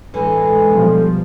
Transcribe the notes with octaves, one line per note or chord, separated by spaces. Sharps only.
A2 D3 E3 G#3
B2 F3 G3